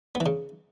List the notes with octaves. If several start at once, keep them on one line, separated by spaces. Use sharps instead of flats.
B3
E3
C#3